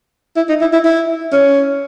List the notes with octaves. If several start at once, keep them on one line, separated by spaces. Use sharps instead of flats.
E4
D#4
E4
E4
E4
C#4